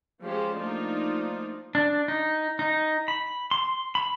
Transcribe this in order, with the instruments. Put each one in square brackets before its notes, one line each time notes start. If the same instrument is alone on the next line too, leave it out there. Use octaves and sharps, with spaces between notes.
[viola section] F3 G#3 C#4 G4 C5
F3 A3 A#3 D4 D#4 F4
[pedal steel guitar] D4
D#4
D#4
B5
C6
B5